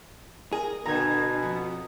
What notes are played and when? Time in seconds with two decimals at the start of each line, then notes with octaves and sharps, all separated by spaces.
0.53 G#4 A#4
0.86 B2 D3 A#5 G#6
1.43 F2